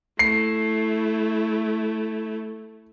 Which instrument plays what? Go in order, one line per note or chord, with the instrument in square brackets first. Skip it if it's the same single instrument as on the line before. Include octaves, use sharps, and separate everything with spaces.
[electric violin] A3 E4 [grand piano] C7